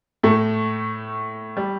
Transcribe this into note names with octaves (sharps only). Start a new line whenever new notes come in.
A2 A3
G3